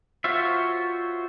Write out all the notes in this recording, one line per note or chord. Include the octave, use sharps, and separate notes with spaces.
F4 F#4 C5 C#5 E5